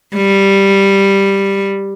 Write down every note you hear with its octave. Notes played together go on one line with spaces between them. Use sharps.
G3